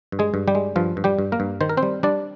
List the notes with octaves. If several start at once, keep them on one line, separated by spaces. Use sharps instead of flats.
G2
G#3 G#4
G2
G3 G4
G#3
G2 F3 F4
G2
G3 G4
G2
A#3 A#4
G2
D#3 C5
A#4
C4 C5
G3
G3 D4 D5